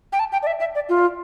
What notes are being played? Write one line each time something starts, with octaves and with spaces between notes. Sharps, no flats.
G5
A5
G5
D5
E5
E5
D5
F4